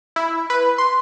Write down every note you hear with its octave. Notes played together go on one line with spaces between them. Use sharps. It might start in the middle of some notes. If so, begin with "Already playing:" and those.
E4
B4
C6